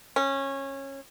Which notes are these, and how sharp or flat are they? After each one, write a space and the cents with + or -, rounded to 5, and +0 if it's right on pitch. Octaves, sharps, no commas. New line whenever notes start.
C#4 -20